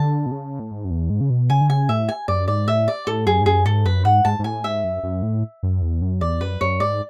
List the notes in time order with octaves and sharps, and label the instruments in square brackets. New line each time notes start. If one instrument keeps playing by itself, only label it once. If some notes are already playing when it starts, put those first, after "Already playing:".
Already playing: [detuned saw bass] D3 [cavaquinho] A5
[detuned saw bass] B2
C#3
A2
G#2
F#2
E2
G#2
C#3
B2
[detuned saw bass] C#3 [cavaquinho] G#5
[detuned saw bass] D3
[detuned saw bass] C#3 [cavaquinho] G#5
[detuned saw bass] A2 [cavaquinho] E5
[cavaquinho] G#5
[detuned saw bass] F#2 [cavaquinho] D5
[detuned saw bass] G#2 [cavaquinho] D5
[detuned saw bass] A2 [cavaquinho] E5
[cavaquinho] D5
[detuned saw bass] A2 [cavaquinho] A4
[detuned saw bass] F#2 [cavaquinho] G#4
[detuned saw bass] G#2
[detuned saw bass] F#2 [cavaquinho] G#4
[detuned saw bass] G#2 [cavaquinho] A4
[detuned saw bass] F#2 [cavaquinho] B4
[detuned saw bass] G#2 [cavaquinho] F#5
[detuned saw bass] G#2 [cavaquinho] A5
[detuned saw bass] G#2
[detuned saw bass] A2 [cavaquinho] G#5
[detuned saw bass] G#2 [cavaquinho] E5
[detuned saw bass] F#2
F#2
A2
F#2
E2
F#2
[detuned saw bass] E2 [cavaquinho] D5
[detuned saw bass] F#2 [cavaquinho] B4
[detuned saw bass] F#2 [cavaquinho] C#5
[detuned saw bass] G#2 [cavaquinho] D5